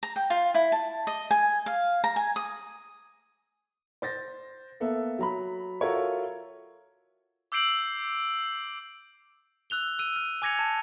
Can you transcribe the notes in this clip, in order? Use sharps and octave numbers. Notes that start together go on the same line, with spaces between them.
A#5
G5
F4
E4
A5
D#5
G#5
F5
A#5
G#5
D#6
C5 A6 A#6
A#3 B3 A4 E5
F#3 A#5 B5
F4 F#4 A4 A#4 C#5 E5
D6 E6 G6 C7 D7 F#7
E6 F#6 F7 G7
E6 D#7
F6
G#5 D6 G#6 A#6 C#7 F7
A5